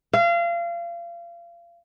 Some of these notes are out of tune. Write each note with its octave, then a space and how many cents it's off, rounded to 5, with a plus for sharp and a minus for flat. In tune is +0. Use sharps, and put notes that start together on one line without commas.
F5 -30